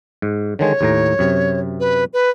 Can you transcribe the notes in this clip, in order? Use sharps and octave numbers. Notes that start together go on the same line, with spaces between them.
G#2
D3 D#3 G#3 C#5
D#2 A2 A#5
F#2 C3
B4
B4